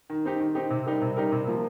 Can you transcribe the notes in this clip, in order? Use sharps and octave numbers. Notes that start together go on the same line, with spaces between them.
D#3
C4 D#4 G4
D#3
C4 D#4 G4
C3
G3 D#4 G4 A#4
C3
G3 D#4 G4 A#4
C3
F3 A#3